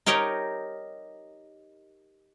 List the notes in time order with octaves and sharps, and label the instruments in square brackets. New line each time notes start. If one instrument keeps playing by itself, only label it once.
[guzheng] D#4 G4 A#4 C#5 D#5